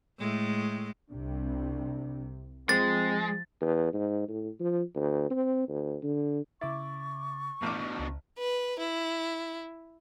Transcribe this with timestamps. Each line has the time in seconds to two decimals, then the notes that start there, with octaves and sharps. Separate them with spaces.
0.19 A2 G#3 A3
1.10 C2 C3 D4
2.69 F3 G#3 C4 A6
3.61 E2
3.93 G#2
4.28 A2
4.60 F3
4.96 D2
5.30 C4
5.69 D2
6.03 D3
6.61 C#3 E4 C#6 D6 A6
7.62 A1 B2 D3 D6 F6 G6
7.99 C#2
8.38 B4
8.79 E4